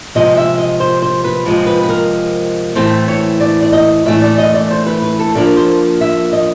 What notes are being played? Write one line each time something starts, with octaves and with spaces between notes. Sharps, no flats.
C3 F3 G#3 D#5
E5
D#5
C5
C5
B4
C3 F3 G#3 C4
B4
B4
A#4
A2 E3 A3 C4 C5
C#5
D5
D5
D#5
A2 E3 A3 C#4 E5
D5
D#5
D5
C5
B4
B4
A4
D3 F3 A#3 A#4
C5
E5
D#5